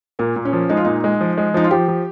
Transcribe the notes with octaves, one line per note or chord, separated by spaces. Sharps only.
A#2 A#3
A#2
C#4
F3
G#3 D#4
F4
A#2 D#4
G#3
F3
G#3
F3 D#4
F4
F3 G4
F3